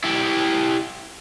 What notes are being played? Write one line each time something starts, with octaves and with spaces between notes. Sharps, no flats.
E4 G4